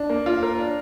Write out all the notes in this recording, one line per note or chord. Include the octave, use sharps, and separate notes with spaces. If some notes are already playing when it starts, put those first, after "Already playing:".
Already playing: D4
A#3
F4
A#4
D4